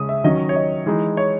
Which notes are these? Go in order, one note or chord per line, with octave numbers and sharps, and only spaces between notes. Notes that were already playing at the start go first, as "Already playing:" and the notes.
Already playing: C#3 G#3 C#4 D#6
E5
D#3 F#3 C#4 D#5
C#5
D#5
E3 G#3 D#4
C#5